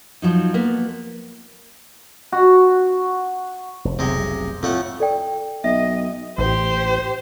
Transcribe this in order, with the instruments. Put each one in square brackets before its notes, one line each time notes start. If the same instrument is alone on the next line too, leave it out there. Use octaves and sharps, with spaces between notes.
[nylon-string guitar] F3 F#3 D#4
A#3 B3
[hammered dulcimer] F#4
[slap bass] F1
[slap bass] F1 B1 [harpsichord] C3 G#3
[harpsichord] F2 A3 F#5 [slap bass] A2
[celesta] A4 D5 G5
[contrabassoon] B1 [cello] D#5 [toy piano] E5
[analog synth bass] A1 [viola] G4 C5